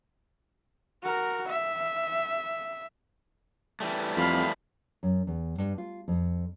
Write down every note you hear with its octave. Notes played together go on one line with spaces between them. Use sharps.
F#4 A#4
E5
E3 G3 A3
F2 F5 B5
F#2
E2
G2
F4
F2